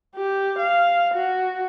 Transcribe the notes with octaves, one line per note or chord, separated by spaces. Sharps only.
G4
F5
F#4